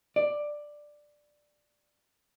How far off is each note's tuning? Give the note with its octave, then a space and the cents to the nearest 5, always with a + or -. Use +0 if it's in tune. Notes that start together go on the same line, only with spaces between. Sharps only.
D5 +10